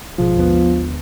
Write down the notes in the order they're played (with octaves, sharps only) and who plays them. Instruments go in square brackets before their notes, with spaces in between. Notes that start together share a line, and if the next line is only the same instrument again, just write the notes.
[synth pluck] G#1 B2 G#3 [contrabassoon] F3
[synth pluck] D#2 D3 B3